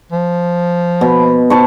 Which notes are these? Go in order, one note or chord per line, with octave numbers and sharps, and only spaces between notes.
F3
B2
C5 A5 C#6